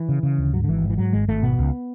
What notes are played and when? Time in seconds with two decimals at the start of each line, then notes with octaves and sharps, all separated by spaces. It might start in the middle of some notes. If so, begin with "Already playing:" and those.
Already playing: E3
0.09 C#3
0.23 C#3
0.38 D2
0.53 G#2 F#3
0.64 D3
0.68 G#1 E3
0.84 G#2
0.90 E3
0.98 G#2 F#3
1.13 G#1 G#3
1.28 G#1 A3
1.43 B2 B3
1.59 C#2